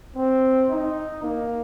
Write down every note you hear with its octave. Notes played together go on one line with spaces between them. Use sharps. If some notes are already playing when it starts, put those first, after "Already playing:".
C4
D#4
A#3